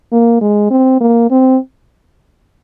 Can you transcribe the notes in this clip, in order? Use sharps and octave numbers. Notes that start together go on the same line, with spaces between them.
A#3
G#3
C4
A#3
C4